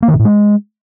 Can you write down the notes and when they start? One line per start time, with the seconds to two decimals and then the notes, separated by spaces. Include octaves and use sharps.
0.02 A#3
0.08 D#3
0.14 A#2
0.19 A2
0.25 G#3